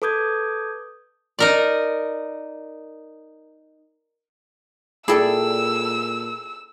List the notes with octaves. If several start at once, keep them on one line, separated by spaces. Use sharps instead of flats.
A4 B4 D6 D#6 G6 G#6
D#4 A#4 D5
A#2 E4 G#4 A4 D5 G5 E6